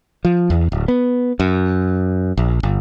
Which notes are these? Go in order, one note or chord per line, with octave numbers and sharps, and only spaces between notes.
F3
E2
D1
B3
F#2
A#1
G1